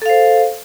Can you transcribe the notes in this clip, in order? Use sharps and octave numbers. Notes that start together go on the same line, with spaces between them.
A4 C5 F5